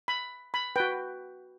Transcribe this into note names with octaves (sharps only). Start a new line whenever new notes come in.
B5
B5
F#4 B4 G5